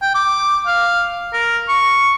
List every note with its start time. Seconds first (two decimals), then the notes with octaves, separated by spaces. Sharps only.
0.02 G5
0.15 D6
0.67 F5
1.33 A#4
1.69 C#6